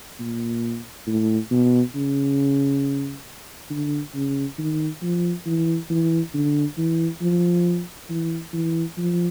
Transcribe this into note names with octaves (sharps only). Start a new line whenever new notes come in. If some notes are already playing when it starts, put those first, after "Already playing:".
A#2
A2
B2
C#3
D3
C#3
D#3
F3
E3
E3
D3
E3
F3
E3
E3
F3